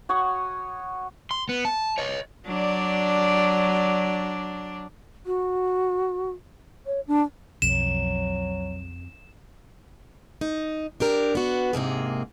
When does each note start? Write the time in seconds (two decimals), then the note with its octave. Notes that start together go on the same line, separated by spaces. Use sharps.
0.09 F#4 C#5 C#6 D#6
1.31 C6
1.49 B3
1.65 A5
1.98 C#5 D#5
2.47 F#3 D4 D5
5.26 F#4
6.86 C#5
7.07 D4
7.62 B1 F2 F#3 E7
10.41 D#4
11.00 D4 G4 A#4
11.35 B3 F#4
11.73 G#2 C3 A#3 G#4